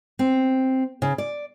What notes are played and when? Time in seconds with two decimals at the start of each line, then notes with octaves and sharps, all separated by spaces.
0.19 C4
1.02 C#3
1.18 D5